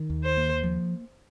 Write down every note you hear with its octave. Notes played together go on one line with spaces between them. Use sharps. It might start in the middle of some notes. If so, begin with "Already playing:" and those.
Already playing: D#3
D#2
C5
A#3
F3